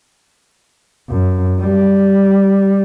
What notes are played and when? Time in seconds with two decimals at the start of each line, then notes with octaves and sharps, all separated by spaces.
1.10 F#2
1.60 G3